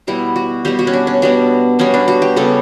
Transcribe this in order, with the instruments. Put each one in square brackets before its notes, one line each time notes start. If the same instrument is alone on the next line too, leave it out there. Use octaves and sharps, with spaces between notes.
[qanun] B2 G3 B3 E4
F#4
B2 G3 B3 G4
F#4
C#4
D4
C#4
B2 G3 B3 D4
B2 G3 B3 C#4
D4
F#4
G4
C#3 G3 B3 A4